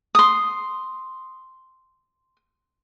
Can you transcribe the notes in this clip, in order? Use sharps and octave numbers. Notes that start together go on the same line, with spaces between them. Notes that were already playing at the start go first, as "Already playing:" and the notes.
C6 D#6